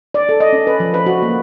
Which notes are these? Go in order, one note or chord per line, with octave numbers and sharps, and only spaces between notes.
D5
A4
D#5
C#4
B4
F3
B4
F#4
A#3